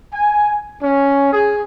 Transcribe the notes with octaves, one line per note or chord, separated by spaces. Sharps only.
G#5
C#4
G#4